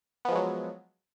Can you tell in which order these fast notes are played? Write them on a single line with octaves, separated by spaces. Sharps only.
B3 F3 G#3 F#3